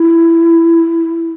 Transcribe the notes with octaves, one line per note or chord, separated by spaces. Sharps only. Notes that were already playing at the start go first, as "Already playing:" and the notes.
Already playing: E4